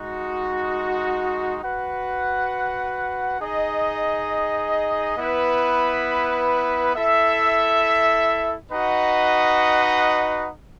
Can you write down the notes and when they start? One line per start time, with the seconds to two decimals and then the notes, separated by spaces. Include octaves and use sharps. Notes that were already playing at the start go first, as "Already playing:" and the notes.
Already playing: G#3 D#4 F#4
1.62 F#4 B4 F#5
3.39 D#4 G#4 D#5
5.17 B3 E4 B4
6.95 E4 A4 E5
8.72 D#4 F#4 B4 D#5 F#5